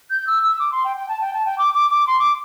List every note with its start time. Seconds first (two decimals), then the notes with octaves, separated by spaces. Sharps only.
0.10 G6
0.27 E6
0.43 E6
0.59 D6
0.72 C6
0.84 G5
0.96 G5
1.09 A5
1.21 G5
1.33 A5
1.45 G5
1.58 D6
1.74 D6
1.90 D6
2.07 C6
2.19 D6